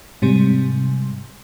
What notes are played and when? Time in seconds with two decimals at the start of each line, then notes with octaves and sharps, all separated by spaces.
0.22 G#2 C3 G3